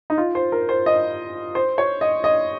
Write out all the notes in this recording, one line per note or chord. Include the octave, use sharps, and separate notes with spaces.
D#4
F4
C5
A#4
C5
D#5
C5
C#5
D#5
D#5